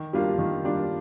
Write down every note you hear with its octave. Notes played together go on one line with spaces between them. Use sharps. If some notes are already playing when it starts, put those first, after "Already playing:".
Already playing: D#3
G3 A#3 D4 F4
D#3
G3 A#3 D4 F4